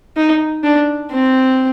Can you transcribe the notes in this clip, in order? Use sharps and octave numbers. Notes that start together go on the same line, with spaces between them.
D#4
D4
C4